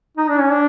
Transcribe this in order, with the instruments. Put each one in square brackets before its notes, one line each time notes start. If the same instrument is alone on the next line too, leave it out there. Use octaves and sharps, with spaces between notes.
[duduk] D#4
D4
C#4
D4